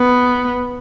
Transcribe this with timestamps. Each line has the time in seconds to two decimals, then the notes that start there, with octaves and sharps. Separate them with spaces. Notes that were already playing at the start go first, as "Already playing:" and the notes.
Already playing: B3